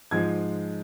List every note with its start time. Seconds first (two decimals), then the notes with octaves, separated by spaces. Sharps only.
0.11 G#2 F3 G#3 G#6